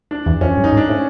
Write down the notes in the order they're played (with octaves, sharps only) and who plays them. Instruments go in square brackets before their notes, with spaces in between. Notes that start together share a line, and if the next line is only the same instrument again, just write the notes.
[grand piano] D4
[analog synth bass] E2
[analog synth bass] F2 [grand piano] C#4
[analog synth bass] G2
[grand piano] D#4
[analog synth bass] G#2
[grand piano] D4
[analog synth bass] A2
[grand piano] C#4